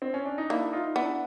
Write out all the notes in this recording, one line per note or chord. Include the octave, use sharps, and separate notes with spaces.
C4
C#4
D4
D#4
A#3 D4 E4
D#4 F4
B3 D4 E4